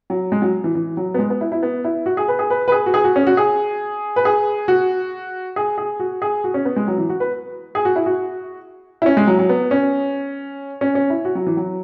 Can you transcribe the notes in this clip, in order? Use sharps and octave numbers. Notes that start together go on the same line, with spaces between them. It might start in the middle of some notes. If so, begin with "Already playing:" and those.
F#3
G#3
F#3
E3
E3
F#3
B3
G#3
B3
E4
E4
B3
E4
F#4
G#4
B4
G#4
B4
B4
G#4
F#4
G#4
F#4
C#4
F#4
G#4
B4
G#4
F#4
G#4
G#4
F#4
G#4
F#4
C#4
B3
G#3
F#3
E3
F#4
B4
G#4
F#4
E4
F#4
E4
C#4
G#3
F#3
F#3
B3
C#4
C#4
C#4
E4
F#4
F#3
E3
F#3